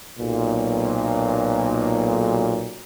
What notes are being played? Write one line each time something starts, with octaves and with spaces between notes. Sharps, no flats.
B1 A#2